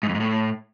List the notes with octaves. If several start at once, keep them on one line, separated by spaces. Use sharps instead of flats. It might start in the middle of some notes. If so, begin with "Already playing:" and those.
G#2
F2
G#2
A2